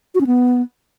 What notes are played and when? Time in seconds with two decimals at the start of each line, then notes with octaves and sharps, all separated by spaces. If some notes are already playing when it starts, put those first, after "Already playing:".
0.15 F#4
0.21 C#4
0.27 B3